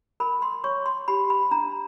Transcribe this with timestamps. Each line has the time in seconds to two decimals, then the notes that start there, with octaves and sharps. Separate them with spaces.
0.20 A#4 B5
0.42 C6
0.64 C#5 C#6
0.86 C6
1.08 G4 B5
1.30 B5
1.51 D4 A#5